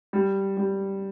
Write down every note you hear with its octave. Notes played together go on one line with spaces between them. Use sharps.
G3
G3